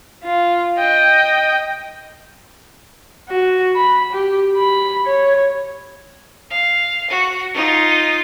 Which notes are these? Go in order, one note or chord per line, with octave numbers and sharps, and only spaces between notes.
F4
D#5 G5
F#4
B5
G4
B5
C#5
F5
F#4
D#4 F4